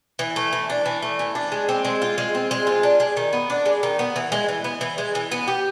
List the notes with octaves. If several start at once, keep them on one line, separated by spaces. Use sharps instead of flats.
E3
A3
E3
D4
E3
A3
E3
D4
G#3
C4
G#3
F4
G#3
C4
G#3
F4
D4
G#3
D#3
B3
D4
G#3
D#3
B3
E3
G#3
E3
B3
E3
G#3
E3
B3
G4